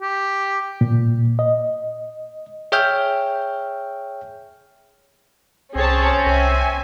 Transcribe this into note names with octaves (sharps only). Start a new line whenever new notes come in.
G4
A#2
D#5
G#4 C#5 E5 G5 F6 G6
C2 C4 C#4 G#4 C#5 A5
C2 E5 G#5